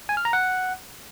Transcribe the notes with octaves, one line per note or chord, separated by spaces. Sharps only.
G#5
F6
A#5
F#5